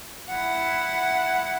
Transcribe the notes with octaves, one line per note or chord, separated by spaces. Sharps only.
E4 F#5